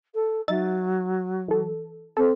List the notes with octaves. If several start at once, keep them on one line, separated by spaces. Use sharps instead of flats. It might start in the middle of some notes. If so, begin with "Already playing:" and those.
A4
F#3 D#4 E5 A6
E3 A4
C4 A4